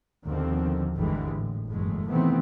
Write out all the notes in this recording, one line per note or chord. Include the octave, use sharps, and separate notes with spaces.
D#2 B2 D3 F3 C4
G#1 E2 D3 E3 G3 G#3
A2
F#1 E2 G2 G#3 A3
C3 D#3 E3 A3 B3 C4